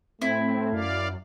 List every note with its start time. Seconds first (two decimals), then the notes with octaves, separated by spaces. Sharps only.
0.22 A2 A3 C4 E4
0.72 F#2 D5 F5